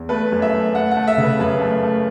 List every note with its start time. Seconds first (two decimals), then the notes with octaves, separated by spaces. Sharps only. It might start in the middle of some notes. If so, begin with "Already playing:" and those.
Already playing: E2
0.09 A3 B4
0.32 F#2
0.42 E5
0.53 A3
0.74 A3 F#5
0.91 F#5
0.97 A3
1.07 E5
1.18 C#3
1.23 B4
1.40 F#2 B4
1.61 A3
1.83 A3